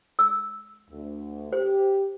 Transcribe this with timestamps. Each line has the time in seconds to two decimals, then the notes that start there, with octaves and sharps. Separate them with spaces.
0.19 E6
0.90 D2
1.53 G4 C5